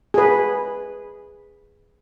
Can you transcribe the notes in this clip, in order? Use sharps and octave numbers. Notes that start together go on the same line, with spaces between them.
G#4 B4